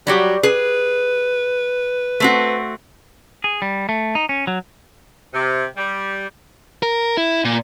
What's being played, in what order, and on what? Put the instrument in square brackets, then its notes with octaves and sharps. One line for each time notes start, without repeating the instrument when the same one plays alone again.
[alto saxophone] F#3 [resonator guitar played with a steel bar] G3 F#4 G4
[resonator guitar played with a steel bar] G#4 [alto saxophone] B4
[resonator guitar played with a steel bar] A3 C4 F#4
[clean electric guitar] G#4
G3
A3
D#4
C#4
F#3
[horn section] C3
G3
[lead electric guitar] A#4
E4
A#2